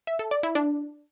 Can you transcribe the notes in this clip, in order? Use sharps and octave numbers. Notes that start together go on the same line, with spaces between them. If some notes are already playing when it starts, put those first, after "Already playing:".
E5
A4
D5
E4
D4